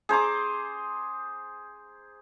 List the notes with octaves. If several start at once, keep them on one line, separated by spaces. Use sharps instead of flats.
G#4 C5 A#5 D6